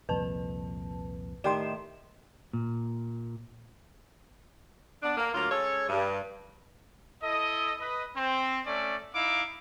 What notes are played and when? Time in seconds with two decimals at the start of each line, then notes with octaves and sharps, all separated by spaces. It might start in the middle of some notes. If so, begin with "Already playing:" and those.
0.09 C2 F2 A#2 B4 A5
1.44 A2 D#3 G4 D5 G5 C6 E7
2.53 A#2
5.03 B3 D4
5.18 A#3
5.34 D2 F#3 A#3 F4 A#4
5.51 G#3 C#4 A4 C#5
5.89 G2
7.23 E4 A4 D#5
7.80 B4 D#5
8.17 C4
8.66 A3 C#4 D5
9.15 D#4 E4 E5 F5 D6